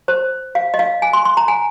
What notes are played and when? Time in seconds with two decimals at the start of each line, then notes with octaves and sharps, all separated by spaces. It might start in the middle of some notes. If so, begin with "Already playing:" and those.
0.08 C5
0.55 F5
0.74 D#5
0.79 F5
1.02 G#5
1.13 C6
1.25 C6
1.37 A#5
1.48 G#5